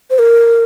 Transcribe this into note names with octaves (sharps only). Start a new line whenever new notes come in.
C5
A#4